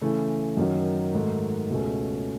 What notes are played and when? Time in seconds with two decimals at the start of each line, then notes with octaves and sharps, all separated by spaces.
0.01 C#3 E3 A3
0.57 F#2 D#3 F#3
1.14 G#2 D#3 F#3 A3
1.70 C#2 B2 A3 C#4 G#4